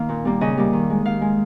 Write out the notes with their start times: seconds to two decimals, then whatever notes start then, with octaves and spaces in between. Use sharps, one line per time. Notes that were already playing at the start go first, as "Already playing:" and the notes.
Already playing: D#3 A#3 F5
0.09 A#2
0.25 G3 A#3
0.41 C#3 D#5
0.58 G3 A#3
0.73 D#3
0.90 G#3
1.05 D#3 F5
1.21 G#3